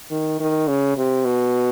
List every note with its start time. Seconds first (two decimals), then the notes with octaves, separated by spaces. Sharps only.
0.11 D#3
0.40 D#3
0.68 C#3
0.97 C3
1.25 B2